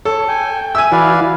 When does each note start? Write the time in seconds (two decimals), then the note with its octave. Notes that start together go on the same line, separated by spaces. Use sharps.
0.05 A4 C#5
0.28 G5 G#5
0.75 E5 G#5 E6
0.92 E3 E4 F#4 B4 D5 F5